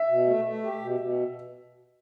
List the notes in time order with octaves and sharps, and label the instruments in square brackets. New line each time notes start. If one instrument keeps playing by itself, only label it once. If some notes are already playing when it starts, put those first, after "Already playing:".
Already playing: [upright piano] E5
[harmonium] B2
A3
A3
G4
B2
B2